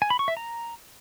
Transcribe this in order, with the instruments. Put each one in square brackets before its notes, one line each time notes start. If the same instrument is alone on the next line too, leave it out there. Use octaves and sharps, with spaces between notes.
[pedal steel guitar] G#5
B5
C#6
E5
A#5